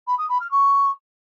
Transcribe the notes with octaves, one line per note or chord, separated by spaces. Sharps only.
B5
D#6
B5
F6
C#6